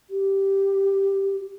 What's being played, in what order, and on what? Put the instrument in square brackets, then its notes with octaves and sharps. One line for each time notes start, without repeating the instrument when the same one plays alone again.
[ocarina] G4